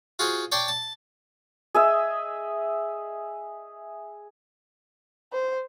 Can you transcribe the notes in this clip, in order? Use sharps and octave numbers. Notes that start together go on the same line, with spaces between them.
F4 F#4 G#4 C5
C#5 D5 G5 A5 C6
A5
G#4 D#5 E5
C5